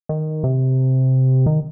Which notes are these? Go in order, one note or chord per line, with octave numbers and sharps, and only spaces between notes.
D#3
C3
D#3